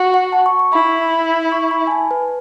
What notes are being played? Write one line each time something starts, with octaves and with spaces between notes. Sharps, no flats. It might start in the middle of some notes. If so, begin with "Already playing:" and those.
Already playing: F#4
F#5
A5
C#6
C#6
E4 B5
C#6
B5
G#5
A5
B4